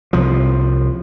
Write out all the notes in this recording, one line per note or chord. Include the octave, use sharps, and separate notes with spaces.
C2 F3